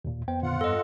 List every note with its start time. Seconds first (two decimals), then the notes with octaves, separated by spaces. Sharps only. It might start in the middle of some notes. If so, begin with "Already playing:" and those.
0.05 D#2 A#2
0.28 F2 B3 C5 G5
0.43 A#2 D3 F4 F#5
0.61 G2 A4 D#5